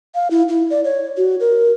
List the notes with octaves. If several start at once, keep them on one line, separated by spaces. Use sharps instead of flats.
F5
E4
E4
D5
C#5
F#4
A#4